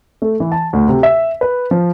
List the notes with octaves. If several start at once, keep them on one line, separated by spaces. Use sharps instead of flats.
A3
E3
A5
D2
C3
E5
B4
F3